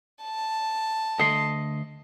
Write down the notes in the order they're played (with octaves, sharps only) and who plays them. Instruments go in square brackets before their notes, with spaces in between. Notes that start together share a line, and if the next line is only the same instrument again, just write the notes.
[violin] A5
[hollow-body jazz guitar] D2 A4 G5 [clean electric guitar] D#5 C6